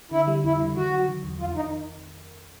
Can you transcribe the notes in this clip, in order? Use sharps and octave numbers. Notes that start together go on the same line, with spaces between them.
D3 E4
G3
F2 E4
D3
D#3 F#4
F#3
D#3
E2
F2 F4
D#3 D#4